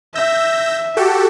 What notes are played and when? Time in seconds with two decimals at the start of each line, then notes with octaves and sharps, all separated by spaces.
0.15 E5 E6 G6 A#6
0.97 F#4 G4 A4